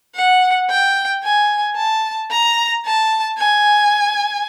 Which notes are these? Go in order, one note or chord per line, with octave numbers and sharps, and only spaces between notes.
F#5
G5
G#5
A5
A#5
A5
G#5